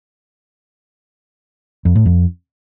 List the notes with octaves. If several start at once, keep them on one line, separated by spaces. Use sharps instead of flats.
F2
A2
F2